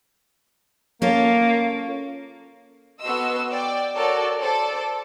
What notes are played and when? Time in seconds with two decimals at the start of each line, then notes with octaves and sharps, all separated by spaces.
1.02 A#3 C#4 F4 A4
3.01 B3 F#4 A4 D#5 C6 E6
3.52 D5 G5
3.95 F#4 A4 A#4 C#5 D5
4.40 A4 C5 D5